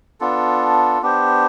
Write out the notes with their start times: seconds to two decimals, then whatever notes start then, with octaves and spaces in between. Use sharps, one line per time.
0.20 B3 D4 F4 A4
1.02 B3 D4 G4 C5